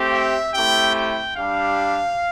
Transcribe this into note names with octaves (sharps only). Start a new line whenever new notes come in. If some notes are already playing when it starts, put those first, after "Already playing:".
Already playing: A3 C4 G4
E5
A3 C4 E4 G4 G5
G5
G3 D4 G4 F5